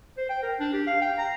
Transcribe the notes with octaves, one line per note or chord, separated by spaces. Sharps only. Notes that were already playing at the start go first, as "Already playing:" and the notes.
C5
G5
A#4
D4
G4
F5
G5
A#5